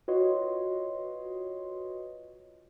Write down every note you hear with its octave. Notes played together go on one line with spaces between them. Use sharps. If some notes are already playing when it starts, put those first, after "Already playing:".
F4 F#4 B4 C#5 D#5 C6